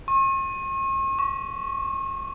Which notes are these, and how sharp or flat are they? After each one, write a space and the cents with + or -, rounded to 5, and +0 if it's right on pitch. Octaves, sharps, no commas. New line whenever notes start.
C#6 -45
C#6 +15